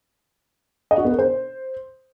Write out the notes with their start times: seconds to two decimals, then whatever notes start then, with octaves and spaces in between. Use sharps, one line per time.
0.91 D#5
0.98 F#4
1.05 B3
1.12 A#4
1.19 C5